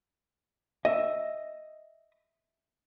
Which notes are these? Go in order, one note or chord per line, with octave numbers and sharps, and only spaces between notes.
D#5 E5